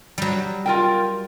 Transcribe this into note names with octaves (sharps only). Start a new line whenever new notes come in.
F#3 G3
F4 A#4 G5